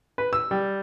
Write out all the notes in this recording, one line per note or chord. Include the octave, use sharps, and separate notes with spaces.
B4
E6
G3